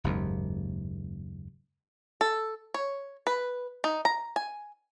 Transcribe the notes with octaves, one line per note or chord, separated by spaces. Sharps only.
F#1 D#2 G#2
A4
C#5
B4
D#4
A#5
G#5